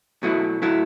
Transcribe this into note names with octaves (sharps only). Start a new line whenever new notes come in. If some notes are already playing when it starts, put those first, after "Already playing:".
B2 F#3 A3 E4
A2 F#3 A3 E4